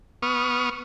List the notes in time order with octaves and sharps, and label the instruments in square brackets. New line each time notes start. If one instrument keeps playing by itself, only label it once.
[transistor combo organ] B3 C#6 D#6 F6